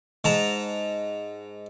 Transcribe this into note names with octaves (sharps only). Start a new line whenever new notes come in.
G#2 A5 A#5